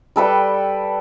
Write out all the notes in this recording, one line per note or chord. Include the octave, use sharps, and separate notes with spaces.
G3 A4 B4 G5